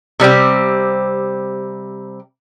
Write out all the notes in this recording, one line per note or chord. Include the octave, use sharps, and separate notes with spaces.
C3 G3 C4 G4